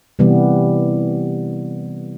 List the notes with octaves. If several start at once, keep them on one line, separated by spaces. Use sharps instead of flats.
C3 E3 G3 B3